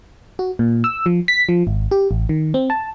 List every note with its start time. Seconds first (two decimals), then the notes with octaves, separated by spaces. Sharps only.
0.39 F#4
0.59 A#2
0.84 E6
1.06 F3
1.28 B6
1.49 F3
1.67 G#1
1.91 G4
2.11 A1
2.29 D#3
2.54 C4
2.70 A5